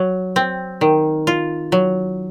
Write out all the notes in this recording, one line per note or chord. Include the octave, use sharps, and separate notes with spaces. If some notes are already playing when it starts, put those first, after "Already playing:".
Already playing: F#3
C4
D#3
F4
F#3